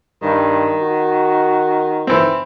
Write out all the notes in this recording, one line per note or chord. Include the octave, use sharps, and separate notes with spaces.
G2 D#3
F#4
E3 C4